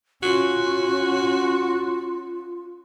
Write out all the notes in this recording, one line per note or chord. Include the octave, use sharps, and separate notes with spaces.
C#4 F4 F#4